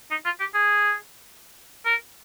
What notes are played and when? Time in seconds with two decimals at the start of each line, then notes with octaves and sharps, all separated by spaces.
0.11 D#4
0.25 F4
0.40 G4
0.54 G#4
1.86 A#4